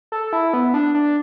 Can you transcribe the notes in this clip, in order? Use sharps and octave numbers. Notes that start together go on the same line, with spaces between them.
A4
E4
B3
D4
D4